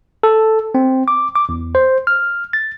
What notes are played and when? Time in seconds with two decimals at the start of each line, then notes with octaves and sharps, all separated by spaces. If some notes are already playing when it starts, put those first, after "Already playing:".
0.23 A4
0.75 C4
1.08 D6
1.36 D6
1.49 E2
1.75 C5
2.07 F6
2.53 A6